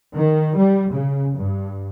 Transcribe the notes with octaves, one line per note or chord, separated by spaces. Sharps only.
D#3
G3
C#3
G2